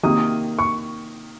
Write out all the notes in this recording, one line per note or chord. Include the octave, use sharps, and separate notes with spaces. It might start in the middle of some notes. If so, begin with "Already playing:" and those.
C3 D#3 A#3 D#6
C#6